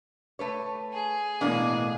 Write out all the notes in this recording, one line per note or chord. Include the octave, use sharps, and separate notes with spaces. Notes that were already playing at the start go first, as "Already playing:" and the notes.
A3 B4 C#5
G#4
A1 B2 A#3 C4 D4